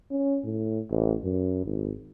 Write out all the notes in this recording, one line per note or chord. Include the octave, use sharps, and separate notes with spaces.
C#4
A2
A1
F#2
G#1